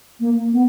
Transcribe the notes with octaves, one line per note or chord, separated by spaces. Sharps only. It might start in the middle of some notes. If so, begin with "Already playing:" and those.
A#3
B3